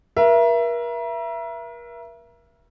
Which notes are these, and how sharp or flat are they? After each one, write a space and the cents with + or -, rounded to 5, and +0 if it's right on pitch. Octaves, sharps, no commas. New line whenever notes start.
A#4 +40 E5 +25